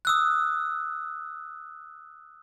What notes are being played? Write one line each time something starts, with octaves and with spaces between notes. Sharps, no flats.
D#6 E6 F#6